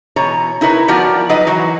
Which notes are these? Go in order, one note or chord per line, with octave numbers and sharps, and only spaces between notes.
B2 E3 C#5 A#5
D#4 E4 A#4 B4 C#5
F3 G3 B3 F#4 A#4 D5
F#3 D#4 F#4 B4 D#5
E3 F#3 F#4